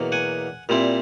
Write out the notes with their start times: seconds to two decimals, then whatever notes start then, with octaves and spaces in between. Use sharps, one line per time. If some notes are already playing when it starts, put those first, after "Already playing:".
Already playing: E2 B2 F#3 A#3
0.12 F#5 G#5
0.69 A#2 G3 C4 E4